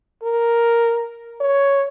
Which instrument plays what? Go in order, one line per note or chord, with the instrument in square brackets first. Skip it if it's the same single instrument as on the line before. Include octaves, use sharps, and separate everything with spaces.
[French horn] A#4
C#5